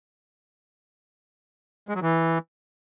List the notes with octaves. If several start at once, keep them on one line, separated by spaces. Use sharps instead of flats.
G#3
F#3
E3